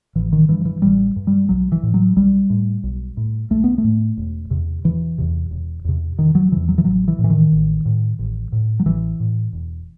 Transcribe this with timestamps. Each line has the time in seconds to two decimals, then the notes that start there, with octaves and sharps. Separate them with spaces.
0.15 A1 E3
0.32 D#3
0.49 G2 E3
0.65 E3
0.82 A1 G3
1.16 G2
1.27 G3
1.49 B1 F#3
1.72 E3
1.83 A2
1.94 F#3
2.16 B1 G3
2.50 A2
2.83 B1
3.17 A2
3.50 B1 A3
3.64 B3
3.78 A3
3.84 A2
4.17 E1
4.50 E2 C3
4.84 E1 E3
5.18 E2 C3
5.51 E1
5.85 E2 C3
6.18 E1 D#3
6.35 F#3
6.52 E2 C3 E3
6.68 F#3
6.78 E3
6.85 A1 F#3
7.08 E3
7.19 A2
7.24 E3
7.30 D#3
7.52 A1
7.85 A2
8.19 A1
8.52 A2
8.80 F#3
8.86 A1 E3
9.20 A2
9.53 E1